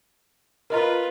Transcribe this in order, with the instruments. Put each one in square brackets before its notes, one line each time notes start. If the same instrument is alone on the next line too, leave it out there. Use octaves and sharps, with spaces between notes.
[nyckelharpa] F4 B4 [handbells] A#4 D#5 A#5